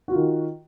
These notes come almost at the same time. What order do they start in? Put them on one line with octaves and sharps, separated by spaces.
F#4 F4 D#3